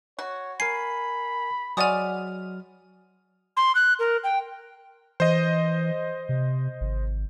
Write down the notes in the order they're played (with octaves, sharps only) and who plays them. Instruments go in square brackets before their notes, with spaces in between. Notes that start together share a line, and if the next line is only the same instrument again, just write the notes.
[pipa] F#4 [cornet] C#5
[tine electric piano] A#4 G#5 [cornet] B5 [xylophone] C7
[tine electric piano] F#3 F6 [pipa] G#3 F#4 D5 [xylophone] G#5 D#6
[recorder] C6
F#6
A#4
G5
[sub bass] E3 [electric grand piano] C5 D#5
[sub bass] C3
G#1